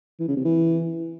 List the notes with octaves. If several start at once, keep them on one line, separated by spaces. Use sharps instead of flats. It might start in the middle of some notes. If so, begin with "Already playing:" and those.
E3
C#3
C3
E3